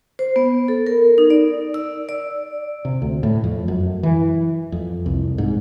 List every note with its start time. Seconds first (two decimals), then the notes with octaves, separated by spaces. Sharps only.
0.19 C5
0.36 B3
0.68 A4
0.87 A#4
1.18 D#4
1.30 D5
1.74 E6
2.09 D5
2.85 C3
3.02 D2
3.23 A2
3.44 F2
3.68 F#2
4.03 E3
4.72 F2
5.06 C2
5.38 G#2